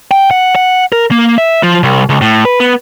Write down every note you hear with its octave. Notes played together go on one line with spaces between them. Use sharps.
G5
F#5
F#5
A#4
A#3
E5
F3
C2
C#2
A2
B4
B3